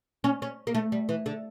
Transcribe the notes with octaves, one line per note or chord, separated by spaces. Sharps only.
C#4
C#4
A#3
A3
G3
E3
D3